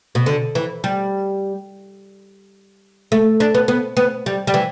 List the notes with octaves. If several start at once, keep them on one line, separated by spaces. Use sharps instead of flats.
B2
D3
E3
G3
A3
D4
B3
B3
B3
G3
G3
E3